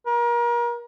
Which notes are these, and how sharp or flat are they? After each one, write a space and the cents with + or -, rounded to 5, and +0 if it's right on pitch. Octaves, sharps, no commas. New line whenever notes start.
A#4 +35